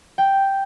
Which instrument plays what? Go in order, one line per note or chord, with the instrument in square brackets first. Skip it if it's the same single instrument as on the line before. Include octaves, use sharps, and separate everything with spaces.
[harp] G5